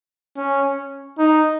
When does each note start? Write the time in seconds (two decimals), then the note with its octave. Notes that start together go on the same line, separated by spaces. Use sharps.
0.37 C#4
1.18 D#4